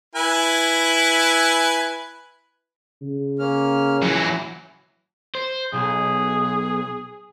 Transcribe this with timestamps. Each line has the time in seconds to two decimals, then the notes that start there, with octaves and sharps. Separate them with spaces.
0.15 E4 B4 G#5
3.02 C#3
3.39 A#3 C#4 F6
4.02 E3 F#3
5.35 C5
5.73 B1 G#4